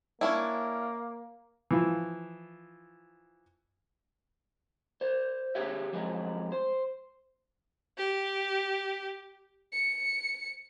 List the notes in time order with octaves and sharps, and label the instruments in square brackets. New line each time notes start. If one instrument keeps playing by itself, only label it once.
[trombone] A#3 [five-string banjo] C#4 D4 E4
[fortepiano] E3 F3
[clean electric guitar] C5 D5
G4 G#4 C#5 E5
F2 F#3 G#3
C5
[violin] G4
C#7